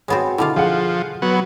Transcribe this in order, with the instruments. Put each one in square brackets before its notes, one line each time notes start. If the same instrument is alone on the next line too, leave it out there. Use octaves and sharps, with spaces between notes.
[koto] G#3 B3 C4 [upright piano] F#4 C#5
[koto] B2 D3 F4 [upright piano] E4
[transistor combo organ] F3 [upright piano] G#4 F5 F#5
[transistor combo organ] F#3 B3